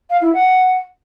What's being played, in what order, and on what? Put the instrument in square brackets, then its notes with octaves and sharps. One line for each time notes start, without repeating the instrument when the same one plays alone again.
[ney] F5
E4
F#5